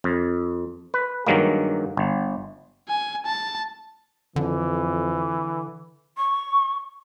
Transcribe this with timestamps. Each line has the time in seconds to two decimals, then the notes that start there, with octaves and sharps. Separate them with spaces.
0.04 F2
0.94 B4
1.27 G2 D#3 F#3 G#3 A#3
1.97 G1
2.89 G#5
3.26 A5
4.36 F2 D3 E3
6.17 C#6